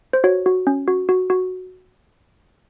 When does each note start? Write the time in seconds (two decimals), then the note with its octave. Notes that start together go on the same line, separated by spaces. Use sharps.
0.13 C5
0.24 F#4 C#5
0.46 F#4
0.67 C#4
0.88 F#4
1.09 F#4
1.30 F#4